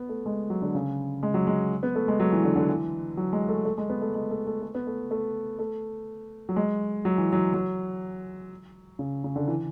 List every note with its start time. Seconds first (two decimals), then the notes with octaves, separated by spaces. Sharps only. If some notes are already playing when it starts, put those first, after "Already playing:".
Already playing: B3
0.09 A3
0.26 G#3
0.50 F#3
0.62 D3
0.75 C#3
1.23 G#3
1.34 F#3
1.47 G#3
1.83 B3
1.95 A3
2.08 G#3
2.20 F#3
2.32 E3
2.44 D3
2.56 D3
2.69 E3
3.17 F#3
3.33 G#3
3.49 A3
3.65 A3
3.78 G#3
3.89 B3
4.02 A3
4.15 G#3
4.31 A3
4.47 A3
4.62 A3
4.75 B3
4.87 A3
5.11 A3
5.59 A3
6.49 F#3
6.56 G#3
7.05 F#3
7.18 E3
7.33 F#3
7.54 F#3
8.99 C#3
9.24 C#3
9.36 D3
9.48 E3